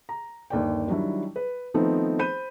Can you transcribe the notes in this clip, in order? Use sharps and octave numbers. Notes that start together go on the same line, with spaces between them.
A#5
G1 D#2 D5 G5
D#3 F#3 G3 D4 E4
B4
D#3 F3 A3 B3 C4 D#4
C5 B5 G6 D#7